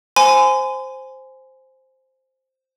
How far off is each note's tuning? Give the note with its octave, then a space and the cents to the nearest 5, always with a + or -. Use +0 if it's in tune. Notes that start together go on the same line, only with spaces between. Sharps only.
C5 +0 G#5 +5 C6 -40